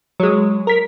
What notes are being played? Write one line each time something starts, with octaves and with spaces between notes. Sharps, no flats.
F#3 G#3
A#4 B6